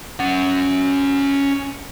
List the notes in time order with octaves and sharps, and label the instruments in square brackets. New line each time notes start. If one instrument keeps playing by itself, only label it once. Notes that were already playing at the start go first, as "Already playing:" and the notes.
[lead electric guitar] C#4 F#5